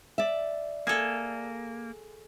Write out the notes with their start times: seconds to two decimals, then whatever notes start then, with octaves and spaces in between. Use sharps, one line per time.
0.18 D5 E5
0.87 A#3 G#4 A4